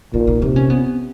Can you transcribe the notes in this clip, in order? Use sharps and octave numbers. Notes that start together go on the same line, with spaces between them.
A#2 D#4
D#4
C3 D#4
C#4
B3